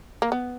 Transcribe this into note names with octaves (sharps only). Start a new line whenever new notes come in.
A#3
B3